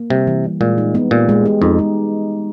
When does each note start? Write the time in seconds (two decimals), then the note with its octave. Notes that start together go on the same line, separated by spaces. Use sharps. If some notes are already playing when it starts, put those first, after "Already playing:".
Already playing: A#3
0.10 C3 G3
0.27 E3
0.44 G3
0.61 A#2 G#3
0.78 D#4
0.95 B3
1.11 A#2 G4
1.29 G#3
1.46 G4
1.61 F2 D#4
1.79 G#3